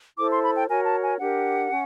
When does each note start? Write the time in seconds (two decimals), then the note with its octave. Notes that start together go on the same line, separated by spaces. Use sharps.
0.17 E4 A4 C5 D6
0.30 C6
0.42 B5
0.56 G5
0.68 F#4 A#4 C#5 G#5
0.85 A5
1.02 G#5
1.19 D4 G4 A#4 F#5
1.71 C#4